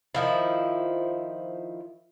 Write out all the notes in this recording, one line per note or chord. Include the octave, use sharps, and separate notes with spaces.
D#3 F3 E4